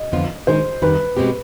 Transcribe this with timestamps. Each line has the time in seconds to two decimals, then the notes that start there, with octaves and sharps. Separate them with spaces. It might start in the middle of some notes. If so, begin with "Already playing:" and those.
Already playing: D#5
0.12 F2 D3 F3 B3 F4
0.47 G#2 D#3 G#3 C5
0.82 F2 D#3 G3 B4
1.17 B2 G#3 C4 G4